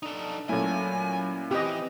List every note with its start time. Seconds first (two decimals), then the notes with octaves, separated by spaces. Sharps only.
0.03 D4 D#4 A4
0.49 A#2 F#3 A3 C#4 E4 G#5
1.51 E3 C4 G4 B4 D#5